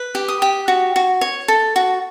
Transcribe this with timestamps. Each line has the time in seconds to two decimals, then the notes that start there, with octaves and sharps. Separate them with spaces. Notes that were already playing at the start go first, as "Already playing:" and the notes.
Already playing: B4
0.15 G4
0.28 D#6
0.42 G4
0.68 F#4
0.96 F#4
1.21 C#5
1.48 A4
1.76 F#4